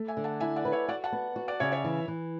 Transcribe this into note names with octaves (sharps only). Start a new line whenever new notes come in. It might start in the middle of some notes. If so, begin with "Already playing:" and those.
Already playing: A3
E5 G#5
D3
F#5 A5
E4 E5 G#5
D5 F#5
B4
C#5 E5
F#4 D5 F#5
F#5 A5
B3
F#4
D5 F#5
C#3 C#5 E5
C#5 E5
E3
E3